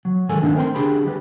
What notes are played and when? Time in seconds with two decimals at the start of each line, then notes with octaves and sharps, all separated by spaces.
0.05 F#3
0.29 G#2 D#3 G#3 A4 G#5
0.42 D#3 A3 B3 C4 D4 D#4
0.56 A#4 C5 G5 B5 C6
0.75 D3 G4 G#4 G5 B5
1.04 D2 G3 B4